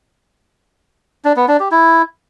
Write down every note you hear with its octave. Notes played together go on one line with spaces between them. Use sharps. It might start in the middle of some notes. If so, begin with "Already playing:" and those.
D4
B3
D4
G4
E4